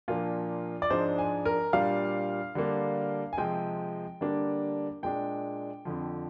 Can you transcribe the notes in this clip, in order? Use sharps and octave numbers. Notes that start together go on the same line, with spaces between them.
A#2 F3 A#3 D4 F4
D5
G#2 F3 G#3 D4 C5
G#5
A#4
A#2 G3 D4 F5
D3 G3 A#3 D4
G#5
C3 F3 G#3 C4 G5
D3 G3 A#3 D4
A#2 G#3 D4 G5
F2 D3 F3